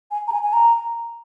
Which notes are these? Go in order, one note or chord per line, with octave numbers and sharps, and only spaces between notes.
G#5
A#5
G#5
G#5
A#5